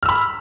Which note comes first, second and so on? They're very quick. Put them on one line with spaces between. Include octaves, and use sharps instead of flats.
F6 E6 B5